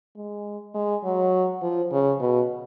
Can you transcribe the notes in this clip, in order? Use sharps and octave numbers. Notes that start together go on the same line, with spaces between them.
G#3
G#3
F#3
F3
C#3
B2